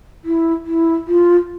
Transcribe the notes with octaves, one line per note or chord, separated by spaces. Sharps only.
E4
E4
F4